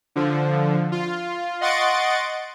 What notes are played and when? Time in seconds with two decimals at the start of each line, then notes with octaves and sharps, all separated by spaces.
0.16 D3 F3
0.92 F4
1.61 D#5 F#5 C6 C#6 A6 D7